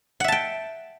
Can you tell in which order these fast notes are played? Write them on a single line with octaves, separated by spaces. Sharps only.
F#5 E5 A5 G5